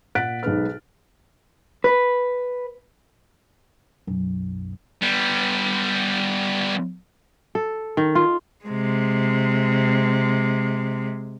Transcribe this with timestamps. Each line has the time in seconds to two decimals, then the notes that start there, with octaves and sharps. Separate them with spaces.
0.15 A#2 F#5 F#6 A6 B6 D7
0.43 B1 G#2 G#4 B4 F6
1.84 B4
4.07 B1 F#2
5.02 G3 B3
7.55 A4
7.97 D#3
8.15 F4
8.65 C3 G#3